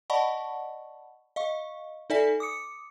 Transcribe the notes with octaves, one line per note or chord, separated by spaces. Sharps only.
D5 D#5 F#5 A5 B5 C#6
D#5 F5 C#6
D#4 A4 D5 E5 G#5 B6
D6 D#6 C#7